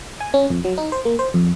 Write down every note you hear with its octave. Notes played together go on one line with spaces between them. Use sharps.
G#5
C#4
F2
F#3
D#4
C5
A#3
C5
F2